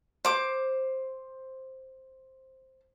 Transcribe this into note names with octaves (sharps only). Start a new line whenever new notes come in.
C5 D6